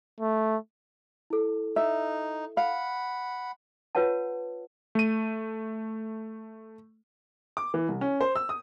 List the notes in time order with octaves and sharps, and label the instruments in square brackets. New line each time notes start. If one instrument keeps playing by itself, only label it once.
[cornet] A3
[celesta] E4 A4
[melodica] D#4 [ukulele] E5
[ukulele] F5 [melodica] F#5 B5
[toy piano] F4 B4 C#5 F#5 A5
[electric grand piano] A3 D#7
[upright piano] D6
E3
C2
C#4
C5
E6
D#6